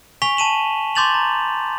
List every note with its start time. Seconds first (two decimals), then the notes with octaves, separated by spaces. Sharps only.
0.22 G#5 C#6 B6 F7 G7
0.37 A5 D#7 E7 F#7
0.95 C6 D6 G6 A6 F7 F#7
1.14 A#5